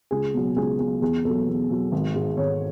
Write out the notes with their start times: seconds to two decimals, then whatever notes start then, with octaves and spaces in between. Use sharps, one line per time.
0.11 C#2 G#4
0.34 B2 F#3
0.56 C#2 G#4
0.79 B2 F#3 G#4
1.02 E2 G#4
1.24 B2 F#3 A4
1.47 E2
1.70 B2 F#3
1.92 G#1
2.16 G#2 G#3
2.37 G#1 C#5